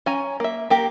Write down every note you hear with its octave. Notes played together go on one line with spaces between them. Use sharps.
C#4 G#5 A#5
A#3 E5
A#3 G4 A#4